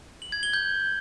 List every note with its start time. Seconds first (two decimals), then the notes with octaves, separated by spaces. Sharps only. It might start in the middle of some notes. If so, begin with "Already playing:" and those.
0.22 F#7
0.32 G#6
0.43 G7
0.53 G6